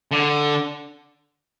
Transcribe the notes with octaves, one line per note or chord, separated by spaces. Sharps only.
D3